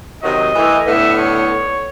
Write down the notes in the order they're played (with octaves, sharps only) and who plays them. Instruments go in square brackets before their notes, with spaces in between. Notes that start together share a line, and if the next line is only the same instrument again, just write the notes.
[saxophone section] C3 D#3 F#3 [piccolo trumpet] D#5
[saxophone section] E3 A3
[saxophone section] A2 D3 B3 [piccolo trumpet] E5
[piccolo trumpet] C#5